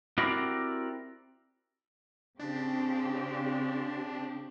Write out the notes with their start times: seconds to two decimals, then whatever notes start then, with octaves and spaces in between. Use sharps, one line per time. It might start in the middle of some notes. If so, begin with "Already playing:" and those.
0.18 C4 E4 F#4 G4 A#4 D5
2.39 C#3 C4 D4 G4